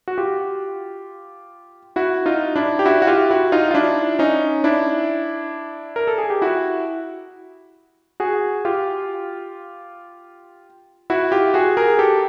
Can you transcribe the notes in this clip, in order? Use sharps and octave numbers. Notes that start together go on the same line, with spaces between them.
F#4
F4 G4
E4 F#4
D#4 F4
D4 E4
G4
E4 F#4
F#4
F4 G4
E4 F#4
D#4 F4
F4
D4 E4
C#4 D#4
D4 E4
A#4
A4
G#4
G4
E4 F#4
F#4 G#4
F4 G4
E4 F#4
F4 G4
F#4 G#4
G#4 A#4
G4 A4